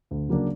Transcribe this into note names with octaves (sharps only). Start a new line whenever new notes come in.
D2
C#3 F#3 A#3 D4